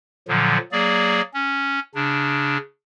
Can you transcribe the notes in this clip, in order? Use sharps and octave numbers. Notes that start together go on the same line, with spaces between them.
A#2 D3 F3 F#3
F#3 A#3 G#4 D5
C#4
C#3 D4